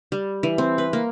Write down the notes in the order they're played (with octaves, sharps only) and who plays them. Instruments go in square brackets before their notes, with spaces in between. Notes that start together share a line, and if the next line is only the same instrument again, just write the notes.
[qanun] G3
E3
C4
B4
A#3